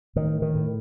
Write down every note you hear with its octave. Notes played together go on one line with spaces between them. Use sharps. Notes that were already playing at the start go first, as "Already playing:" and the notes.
A2 D#3
D#3
A2